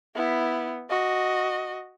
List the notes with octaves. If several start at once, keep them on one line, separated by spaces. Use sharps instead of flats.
B3 E4
F#4 D#5